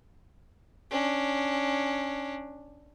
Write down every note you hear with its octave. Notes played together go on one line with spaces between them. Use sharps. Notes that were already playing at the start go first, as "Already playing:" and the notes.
C#4 D4